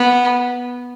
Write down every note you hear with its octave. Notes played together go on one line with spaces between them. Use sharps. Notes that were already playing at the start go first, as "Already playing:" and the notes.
Already playing: B3